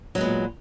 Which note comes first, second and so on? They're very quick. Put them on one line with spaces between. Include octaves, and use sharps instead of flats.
F#3 G#3 B3 A#2